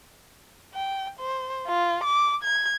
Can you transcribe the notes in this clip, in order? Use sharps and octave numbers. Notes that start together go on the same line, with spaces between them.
G5
C5
F4
D6
G#6